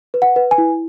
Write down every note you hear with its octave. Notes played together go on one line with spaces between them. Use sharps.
B4
F#5
B4
G#5
E4